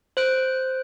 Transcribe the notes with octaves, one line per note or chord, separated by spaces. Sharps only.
C5 F#6 D7